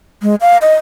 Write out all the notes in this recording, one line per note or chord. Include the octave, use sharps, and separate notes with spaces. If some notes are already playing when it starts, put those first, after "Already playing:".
G#3
F5
D#5